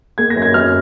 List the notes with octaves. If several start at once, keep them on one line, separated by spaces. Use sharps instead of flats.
A#3 G#6
A#6
F#2
G#6
F#2 F6